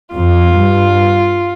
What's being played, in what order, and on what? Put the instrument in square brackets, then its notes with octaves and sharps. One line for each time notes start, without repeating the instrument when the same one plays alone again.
[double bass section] F2 [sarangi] F4
[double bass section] G2